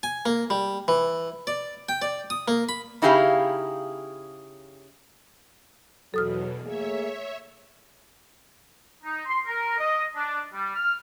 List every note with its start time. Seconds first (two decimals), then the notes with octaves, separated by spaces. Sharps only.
0.03 G#5
0.26 A#3
0.50 G3
0.88 E3
1.47 D5
1.89 G5
2.02 D5
2.30 D#6
2.48 A#3
2.69 B5
3.02 C#3 D#4 E4 G4 G#4 F5
6.14 E2 B2 F#3 A4 D#6 F6
6.65 A3 A#3 G#4 C#5 E5
9.04 D#4
9.26 C6
9.46 A#4
9.78 D#5
10.16 D4
10.53 G3
10.76 F6